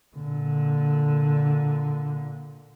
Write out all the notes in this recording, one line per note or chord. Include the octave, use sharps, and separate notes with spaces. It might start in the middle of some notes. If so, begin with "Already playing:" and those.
A#2 D3